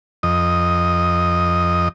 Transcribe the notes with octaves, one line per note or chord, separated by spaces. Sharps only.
F2 D#5